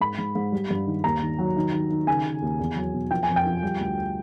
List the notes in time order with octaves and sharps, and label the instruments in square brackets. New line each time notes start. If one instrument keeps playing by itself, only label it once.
[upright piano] G#2 B5
G#2
G#2
G3
G2
D#3
D#2 A#5
D#3
F#3
D#3
D#3
D#3
C#3 G#5
C#3
D#2
E2
F#3
B2
F3 G5
G#5
F2
G5
F3
G3
D2